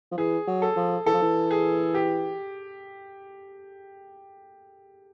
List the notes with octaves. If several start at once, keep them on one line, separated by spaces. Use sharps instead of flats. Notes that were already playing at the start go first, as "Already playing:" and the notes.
F3
E3 G#4
F#3
A4
F3
E3 A4
F3
E3
G#4
G4